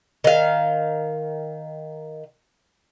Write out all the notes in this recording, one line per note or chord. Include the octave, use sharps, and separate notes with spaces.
D#3 F5